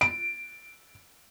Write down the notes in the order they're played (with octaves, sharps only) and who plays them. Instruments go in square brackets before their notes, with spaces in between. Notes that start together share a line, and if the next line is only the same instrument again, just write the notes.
[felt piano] D7